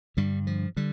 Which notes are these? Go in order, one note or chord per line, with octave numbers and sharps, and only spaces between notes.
G2 D3 G3
F3
D3 G3